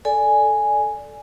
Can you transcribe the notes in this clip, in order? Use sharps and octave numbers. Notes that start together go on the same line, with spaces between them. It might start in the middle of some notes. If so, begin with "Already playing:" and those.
A4 D5 G#5